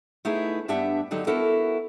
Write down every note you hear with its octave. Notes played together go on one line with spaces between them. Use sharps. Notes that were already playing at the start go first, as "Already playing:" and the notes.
A3 B3 D#4 E4 G#4
G2 B3 D4 G4 E5 F#5
D#2 D3 F#3 D#4 G4
B3 E4 F#4 A4 A#4